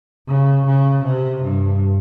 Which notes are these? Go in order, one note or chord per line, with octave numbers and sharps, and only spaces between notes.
C#3
C#3
C3
G2